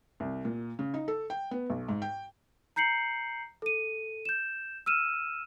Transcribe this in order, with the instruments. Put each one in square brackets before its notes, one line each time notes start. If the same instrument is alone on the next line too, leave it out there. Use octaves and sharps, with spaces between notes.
[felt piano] C2
A#2
C#3
D#4
A4
G5
B3
B1
G#2
G5
[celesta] A#5 G6 C7 C#7 F#7
A4 D#7
G6 E7
E6 F6 D#7 E7